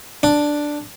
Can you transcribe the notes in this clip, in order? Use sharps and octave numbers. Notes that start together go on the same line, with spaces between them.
D4